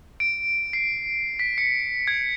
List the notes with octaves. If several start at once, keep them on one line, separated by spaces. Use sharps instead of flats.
D7
C7
B6
C#7
G#6